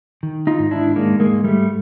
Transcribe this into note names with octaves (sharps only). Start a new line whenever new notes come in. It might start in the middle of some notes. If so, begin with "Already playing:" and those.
D#3
D#4 F4
G#2
D4 E4
D#3 G#3 A#3
G#3 A#3
G#2
G3 A3